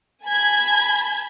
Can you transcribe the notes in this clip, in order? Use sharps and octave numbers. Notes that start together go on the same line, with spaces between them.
G#5 A5 B5 G#6